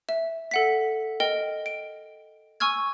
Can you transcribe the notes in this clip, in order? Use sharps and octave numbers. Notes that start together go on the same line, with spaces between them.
E5
A4 F#5 B6
A#4 D#5 G5
D7
G#5 C#6 E6 F6 G#6